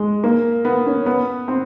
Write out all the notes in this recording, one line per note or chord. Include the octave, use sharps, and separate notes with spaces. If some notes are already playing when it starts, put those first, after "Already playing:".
Already playing: G#3
A#3
B3
C#4
B3
C4